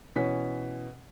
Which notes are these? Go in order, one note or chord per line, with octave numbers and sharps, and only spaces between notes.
B2 E3 C#4 B6